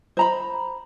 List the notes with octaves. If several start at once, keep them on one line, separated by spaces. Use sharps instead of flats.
C5 A#5 B5